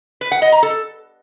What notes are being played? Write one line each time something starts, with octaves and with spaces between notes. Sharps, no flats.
B4
F#5
D#5
A#5
A4